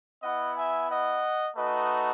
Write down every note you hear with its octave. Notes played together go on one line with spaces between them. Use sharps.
B3 E4 D#5 F#5
E5 G#5
D#5 F#5
A3 D#4 F#4 B4 D#5